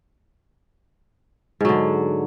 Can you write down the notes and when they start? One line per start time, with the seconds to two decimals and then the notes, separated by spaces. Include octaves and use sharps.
1.61 G#2
1.65 F#3
1.69 D3